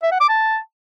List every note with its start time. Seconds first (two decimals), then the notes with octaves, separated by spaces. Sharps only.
0.03 E5
0.12 F#5
0.20 D6
0.29 A5